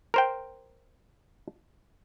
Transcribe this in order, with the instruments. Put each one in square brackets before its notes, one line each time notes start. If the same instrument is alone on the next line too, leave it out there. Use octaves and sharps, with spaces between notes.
[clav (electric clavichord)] A#4 C5 G5